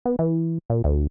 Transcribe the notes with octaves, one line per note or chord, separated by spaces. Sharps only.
B3
E3
A#2
D2